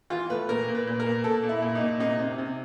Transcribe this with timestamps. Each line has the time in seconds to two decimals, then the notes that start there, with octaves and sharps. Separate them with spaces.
0.10 E3 F4
0.30 A2 B4
0.49 A#2 A#4
0.68 A#2
0.75 B4
0.87 A#2
1.00 A#4
1.06 A#2
1.24 A#2 A4
1.43 A#2
1.49 E4
1.62 A#2
1.75 D#4
1.81 A#2
2.00 C3 D#4
2.19 C3
2.38 C3